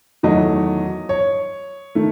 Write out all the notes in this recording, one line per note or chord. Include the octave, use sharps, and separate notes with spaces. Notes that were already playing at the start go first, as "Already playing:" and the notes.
E2 D#3 F#3 A3 D#5
C#5
D#3 A3